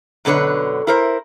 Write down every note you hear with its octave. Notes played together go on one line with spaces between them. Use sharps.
F#2 B2 D3 B4 C#5
E4 A#4 C5